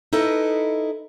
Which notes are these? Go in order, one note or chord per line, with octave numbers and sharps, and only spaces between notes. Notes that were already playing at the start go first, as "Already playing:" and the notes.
D#4 E4 A4 B4 D#5